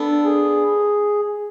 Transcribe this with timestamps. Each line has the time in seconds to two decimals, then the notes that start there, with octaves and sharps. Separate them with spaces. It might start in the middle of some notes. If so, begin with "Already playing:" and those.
Already playing: B3 D4 A4
0.24 G#4